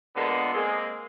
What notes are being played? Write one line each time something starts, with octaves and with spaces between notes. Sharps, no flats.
D3 G#3 A#3 B3 F4
G#3 A#3 C4 G#4